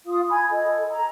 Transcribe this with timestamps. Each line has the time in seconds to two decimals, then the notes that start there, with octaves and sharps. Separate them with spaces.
0.07 F4 F5 D#6
0.30 G#5 B5 G#6
0.51 A4 D#5
0.89 A#5